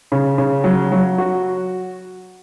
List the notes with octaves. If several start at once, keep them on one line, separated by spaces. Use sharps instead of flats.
C#3
C#3
F#3
F#3
F#4